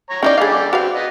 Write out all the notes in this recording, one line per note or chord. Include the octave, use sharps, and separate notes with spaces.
C#5 A#5
C#4 D#4 E4 D5 F5 G5
D3 G3 G#4 D5 F5
C4 F#4 B4 F5
B3 D#5